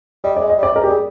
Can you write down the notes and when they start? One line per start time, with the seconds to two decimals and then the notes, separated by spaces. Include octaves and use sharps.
0.24 G3 D#5
0.37 D5
0.41 G#3
0.50 D#5
0.58 G3
0.63 D5
0.75 G#3 A#4
0.84 G4
0.87 G3 G#4